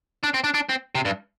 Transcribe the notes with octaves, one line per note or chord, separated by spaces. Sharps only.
D4
C4
D4
D4
C4
C3
G2